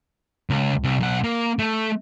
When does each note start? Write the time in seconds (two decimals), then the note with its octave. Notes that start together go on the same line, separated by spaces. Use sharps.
0.50 C#2
0.84 C2
1.00 B1 F#5
1.24 A#3
1.59 A3